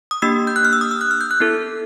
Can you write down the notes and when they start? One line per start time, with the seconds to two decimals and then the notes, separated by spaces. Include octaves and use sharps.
0.11 D#6
0.22 A#3 D4 G4 E6
0.47 G6
0.56 F#6
0.65 F6
0.73 E6
0.81 D#6
0.91 E6
1.01 F#6
1.11 F6
1.21 G6
1.31 F#6
1.40 B3 E4 A4